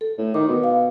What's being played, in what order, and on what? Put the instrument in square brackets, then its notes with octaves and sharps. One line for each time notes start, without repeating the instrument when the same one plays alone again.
[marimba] A4
[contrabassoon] A2
[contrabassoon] D#3 [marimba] D6
[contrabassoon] B2
[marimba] F5